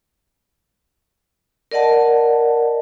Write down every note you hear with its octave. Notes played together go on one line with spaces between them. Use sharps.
A#4 D5 D#5 F#5 A5